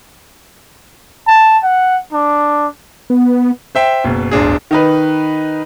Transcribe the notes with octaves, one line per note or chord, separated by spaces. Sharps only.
A5
F#5
D4
B3
C5 E5 G5
F#1 B2
D1 G1 D4 G#4
D#3 D#4 B4